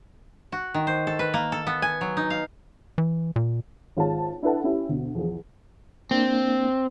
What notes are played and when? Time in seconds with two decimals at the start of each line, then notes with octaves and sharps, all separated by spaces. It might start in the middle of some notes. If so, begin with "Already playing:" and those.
0.52 F#4
0.74 D#3
0.87 C5
1.07 A4
1.19 B4
1.34 A#3
1.52 A4
1.67 B3
1.82 G#5
2.01 F#3
2.17 D#4
2.30 F5
2.98 E3
3.36 A#2
3.97 G#1 F4 G#4 C#5 A5
4.42 D4 E4 A4 B4 F#5 A5
4.64 C#4 E4 G4
4.89 D2 B2
5.15 E2 F3 G#4
6.11 A#3 C4 D4